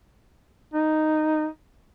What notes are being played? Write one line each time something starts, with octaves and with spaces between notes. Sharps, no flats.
D#4